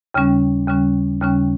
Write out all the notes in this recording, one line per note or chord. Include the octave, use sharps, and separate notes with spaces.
D#2 C#3 G3 C#4
D#2 C#3 G3 C#4
D#2 C#3 G3 C#4